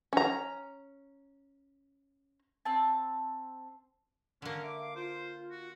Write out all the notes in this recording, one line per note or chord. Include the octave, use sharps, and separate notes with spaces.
C#4 A#5
C4 A5
D3 A#3 C#4
E5 D6
F5
F4 C5
F#4